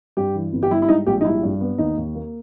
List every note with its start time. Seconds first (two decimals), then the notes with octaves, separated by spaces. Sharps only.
0.17 G2 G4
0.35 E3
0.53 G1
0.63 G4
0.70 G3 E4
0.82 E4
0.88 G#2 D#4
1.07 A#1 G4
1.21 D#4
1.25 G3 E4
1.43 G2
1.61 B3
1.78 D#2 D#4
1.97 D#2
2.15 A#3